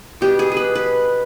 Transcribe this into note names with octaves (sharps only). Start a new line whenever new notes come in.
B2 G3 D4 G4
G#4
G#4 B4
B4